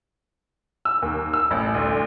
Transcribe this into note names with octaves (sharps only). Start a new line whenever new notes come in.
E6
D#2
E6
A1
D2